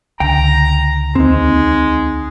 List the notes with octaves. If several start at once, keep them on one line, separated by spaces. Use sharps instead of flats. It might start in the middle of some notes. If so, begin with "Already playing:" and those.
C#2 D3 G5 A#5
D#2 G#3 C4 D#4